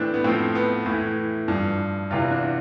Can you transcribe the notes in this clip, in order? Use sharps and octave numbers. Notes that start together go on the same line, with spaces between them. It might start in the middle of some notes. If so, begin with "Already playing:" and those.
Already playing: A2 E3 C4 D4
B3
A2 F3 C4
B3
A2 E3
G2 F3
E2 C3 E3 F4
D4